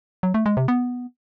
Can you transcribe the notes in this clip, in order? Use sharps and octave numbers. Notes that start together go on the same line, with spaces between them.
F#3
A3
G#3
C3
B3